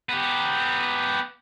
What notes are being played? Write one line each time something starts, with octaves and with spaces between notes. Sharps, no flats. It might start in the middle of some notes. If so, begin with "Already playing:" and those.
B3 G4